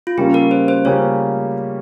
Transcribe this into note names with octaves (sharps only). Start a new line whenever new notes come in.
F4
C#3 G3 A#3 C#4 F4 G4
A#4
C5
C5
C#3 G3 A#3 C#4 F4 C#5